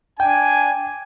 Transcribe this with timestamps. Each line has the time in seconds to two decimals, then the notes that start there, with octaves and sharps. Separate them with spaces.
0.20 D4 G5 G#5